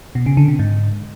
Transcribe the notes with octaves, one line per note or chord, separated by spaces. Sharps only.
B2
C#3
D3
C3
G#2